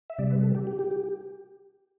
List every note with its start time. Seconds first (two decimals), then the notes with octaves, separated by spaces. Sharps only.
0.10 E5
0.18 C3 G3 D5
0.30 B4
0.43 A4
0.55 G4
0.67 G4
0.79 G4
0.91 G4
1.03 G4